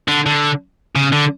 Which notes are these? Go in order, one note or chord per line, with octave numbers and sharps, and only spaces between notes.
D3
D3
C#3
D3